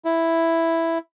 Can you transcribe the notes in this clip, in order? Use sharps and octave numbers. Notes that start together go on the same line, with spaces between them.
E4